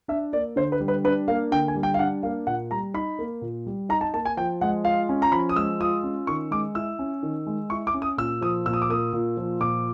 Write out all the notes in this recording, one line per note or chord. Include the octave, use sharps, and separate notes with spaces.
D4 E5
A#3 D5
D3 C5
B4
G3
B4
D4 B4
A#3 F5
D3 G5
G#5
G3
G5
F5
D4 F#5
A#3 F5
A#2 F#5
G3 A#5
D#4 B5
A#3
A#2
G3
D#4 A#5
A5
A#3 A5
G#5
F3 G5
G#3 F#5
F4 F5
C#4
A#5
F3 B5
D#6
G#3 E6
F4 D#6
C#4
D#3 C#6
G#3 D6
E4 E6
C#4
D#3
G#3
E4 C#6
D6
C#4
D#6
A#2 E6
F3 D#6
A#2 E6
D#6
D6
A#3 D#6
A#2
F3
A#2 D6